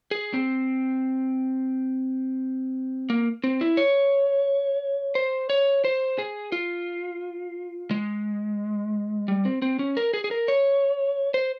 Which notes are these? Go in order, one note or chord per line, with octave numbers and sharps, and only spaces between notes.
G#4
C4
A#3
C4
E4
C#5
C5
C#5
C5
G#4
F4
G#3
G3
C4
C4
C#4
A#4
G#4
G#4
A#4
C#5
C5